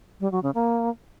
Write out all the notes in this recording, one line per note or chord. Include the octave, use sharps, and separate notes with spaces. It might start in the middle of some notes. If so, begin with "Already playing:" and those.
G3
F#3
C#3
A#3